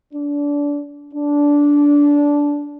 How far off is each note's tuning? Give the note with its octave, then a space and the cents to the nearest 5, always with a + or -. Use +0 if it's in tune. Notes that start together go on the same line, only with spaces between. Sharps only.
D4 -25
D4 -15